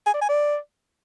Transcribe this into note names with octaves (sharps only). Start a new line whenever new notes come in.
G#5
D5
G#5
D5